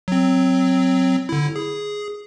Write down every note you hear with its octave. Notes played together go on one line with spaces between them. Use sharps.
F#3 C4
D3 E4
G#4